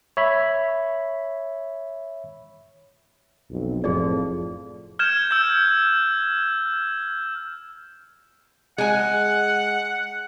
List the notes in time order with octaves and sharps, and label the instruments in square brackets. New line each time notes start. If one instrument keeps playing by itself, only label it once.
[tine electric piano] C#5 E5 B5
[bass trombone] B1 [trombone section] F2
[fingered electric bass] F1 F#2 C4 [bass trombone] A2 [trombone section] F3 [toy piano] G#4 D5
[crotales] F6 G6 G#6 E7
E6 G6
[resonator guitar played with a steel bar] G#3 G#5 [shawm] F#5